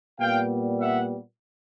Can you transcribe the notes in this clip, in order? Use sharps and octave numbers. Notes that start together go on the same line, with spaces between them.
A#2 G3 B3 F5 G5
E5 F#5